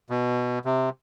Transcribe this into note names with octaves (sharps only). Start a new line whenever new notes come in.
B2
C3